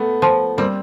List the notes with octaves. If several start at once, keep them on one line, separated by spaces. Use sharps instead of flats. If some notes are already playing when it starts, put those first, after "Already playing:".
Already playing: A3 B3
F3
G3 A#3 C4